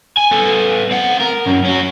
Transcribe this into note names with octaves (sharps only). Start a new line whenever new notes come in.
G#5
B3 A4
C4 F#5
A#4
F#2 C#3
C#4 F#4